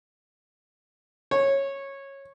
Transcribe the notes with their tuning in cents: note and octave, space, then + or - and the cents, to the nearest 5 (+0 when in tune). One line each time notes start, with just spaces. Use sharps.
C#5 -15